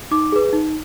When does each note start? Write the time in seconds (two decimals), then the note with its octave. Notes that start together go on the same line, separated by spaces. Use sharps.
0.11 D#4 D6
0.32 G#4 B4
0.53 D#4